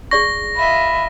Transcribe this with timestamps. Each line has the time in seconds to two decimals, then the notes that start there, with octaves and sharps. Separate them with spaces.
0.11 G#4 D5 C#6 A#6
0.56 F4 D#5 E5 B5